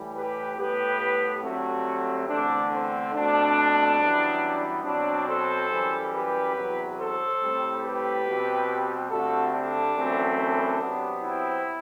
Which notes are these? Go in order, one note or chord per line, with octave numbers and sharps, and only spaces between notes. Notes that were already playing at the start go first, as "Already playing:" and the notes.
Already playing: A2 E3 G3
G4 B4
A2 G3 B3 G4 B4
G2 F#3 A3 C4 F#4 A4
E2 D3 A3 C4 D4
C4
B2 A3 C4 D4
F#2 E3 G3 B3
B2 F#3 C4 D4
A4 C5
F#2 E3 G3
G4 B4
E2 C3 F#3
A4 C5
A2 G3 C4
G4 B4
B2 G3 C4
G2 D3 A3 C4 F#4 A4
D4
F#2 E3 A3 C4
D4
C3 F#3 B3
C4 E4